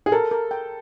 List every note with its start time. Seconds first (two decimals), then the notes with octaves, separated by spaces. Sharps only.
0.06 G#4
0.12 A4 A#4
0.31 A#4
0.51 G5